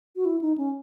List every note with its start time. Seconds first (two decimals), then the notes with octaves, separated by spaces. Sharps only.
0.16 F#4
0.25 E4
0.41 D#4
0.58 C#4